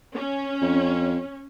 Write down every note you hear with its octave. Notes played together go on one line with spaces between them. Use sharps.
C#4
F2